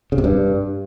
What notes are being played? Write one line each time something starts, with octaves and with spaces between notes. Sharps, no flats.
C#3
C3
G2